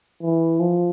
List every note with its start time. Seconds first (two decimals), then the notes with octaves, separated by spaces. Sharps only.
0.22 E3
0.60 F3